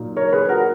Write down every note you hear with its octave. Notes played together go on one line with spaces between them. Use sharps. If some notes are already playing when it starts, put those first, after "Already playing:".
Already playing: A#2 F#3 A#3 D#4
A#4 C#5
G#4 B4
F#4 A#4